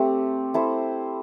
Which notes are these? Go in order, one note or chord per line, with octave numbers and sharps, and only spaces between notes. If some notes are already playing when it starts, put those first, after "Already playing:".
Already playing: A3 C4 G4
E4 A4 C5